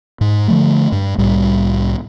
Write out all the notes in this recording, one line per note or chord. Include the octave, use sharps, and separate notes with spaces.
G#2
D3 F3 A3
G2
C2 A2 G3